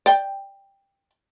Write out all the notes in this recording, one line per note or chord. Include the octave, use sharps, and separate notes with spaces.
D5 G5